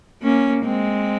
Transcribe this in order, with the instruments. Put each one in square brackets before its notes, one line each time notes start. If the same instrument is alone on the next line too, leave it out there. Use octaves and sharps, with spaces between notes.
[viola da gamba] A#3 C#4
G#3 C4